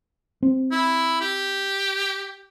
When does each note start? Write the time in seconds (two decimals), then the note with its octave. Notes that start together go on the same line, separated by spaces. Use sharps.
0.43 C4
0.71 E4
1.21 G4